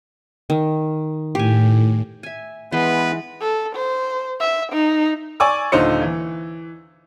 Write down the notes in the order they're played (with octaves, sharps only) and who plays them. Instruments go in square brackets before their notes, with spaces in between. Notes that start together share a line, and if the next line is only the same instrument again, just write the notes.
[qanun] D#3
[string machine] A2 [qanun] G4 G#5
[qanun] E5 G#5
[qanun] E3 G#3 C6 [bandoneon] B3 [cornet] B4
[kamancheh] A4
C5
E5
D#4
[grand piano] D5 G#5 C#6 D6 E6
D#1 D3 D#4 F4 C5 C#7
E3